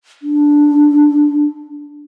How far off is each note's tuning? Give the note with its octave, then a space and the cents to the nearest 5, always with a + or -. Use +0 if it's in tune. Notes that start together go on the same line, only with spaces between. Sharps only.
D4 -5